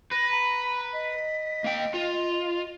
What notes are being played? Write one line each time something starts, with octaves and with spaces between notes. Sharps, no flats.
B4 A#6
A#5 B5
D#5 B6
A#3 G5
F4 F7